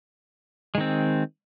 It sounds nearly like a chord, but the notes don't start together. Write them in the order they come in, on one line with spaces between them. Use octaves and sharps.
G#3 D#3 C4